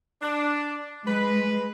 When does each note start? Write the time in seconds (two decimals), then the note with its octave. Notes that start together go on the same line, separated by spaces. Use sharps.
0.22 D4
1.07 G#3 B4